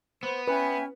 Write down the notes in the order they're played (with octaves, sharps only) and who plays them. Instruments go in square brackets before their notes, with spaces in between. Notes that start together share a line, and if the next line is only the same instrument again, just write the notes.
[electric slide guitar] B3 [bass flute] C5
[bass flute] C#4 [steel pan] B4 [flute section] E5 G5 G#5